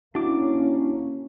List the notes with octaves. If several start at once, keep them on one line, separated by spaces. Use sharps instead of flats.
A#3 C#4 D4 E4 F#4 D6